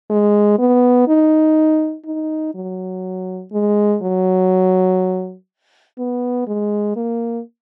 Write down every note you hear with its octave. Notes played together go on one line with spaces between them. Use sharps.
G#3
B3
D#4
D#4
F#3
G#3
F#3
B3
G#3
A#3